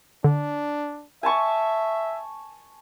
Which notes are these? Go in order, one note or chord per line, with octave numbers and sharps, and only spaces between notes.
D3 D4
E5 G#5 A5 C#6